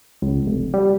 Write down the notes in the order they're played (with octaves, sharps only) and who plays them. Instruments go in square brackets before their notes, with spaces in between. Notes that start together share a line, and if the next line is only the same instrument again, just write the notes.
[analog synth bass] C#2
F1
G3